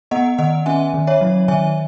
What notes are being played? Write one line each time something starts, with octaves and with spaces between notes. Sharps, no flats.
B3 D#5 F#5
D#3 D#5 F#5
C#4 E5 G#5
D#3
C#5 E5
F#3
D#3 E5 G#5